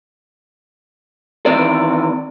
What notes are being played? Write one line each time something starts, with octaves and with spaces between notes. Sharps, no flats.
D#2 E3 C4 D5